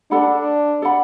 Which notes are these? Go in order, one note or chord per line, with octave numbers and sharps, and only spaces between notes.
D4 A4 D5 F#5 B5
A4 D5 F#5 B5